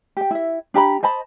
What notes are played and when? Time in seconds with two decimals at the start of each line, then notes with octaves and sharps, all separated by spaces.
0.17 G4 G5
0.31 E4 E5
0.74 D4 G4 A#5 B5
1.03 C5 D#5 A5 B5